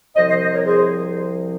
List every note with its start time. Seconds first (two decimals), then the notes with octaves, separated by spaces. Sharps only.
0.16 C2 C3 F3 C5 D#5
0.29 C5 D#5
0.41 C5 D#5
0.54 A#4 C#5
0.66 G#4 C5